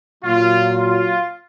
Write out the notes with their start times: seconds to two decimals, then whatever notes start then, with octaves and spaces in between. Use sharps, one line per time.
0.24 A#2 F#3 F4
0.76 F4